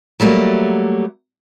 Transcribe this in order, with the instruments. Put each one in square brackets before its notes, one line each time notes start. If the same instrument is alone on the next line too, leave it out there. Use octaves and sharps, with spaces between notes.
[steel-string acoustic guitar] F#3 G3 A3 A#3 F#4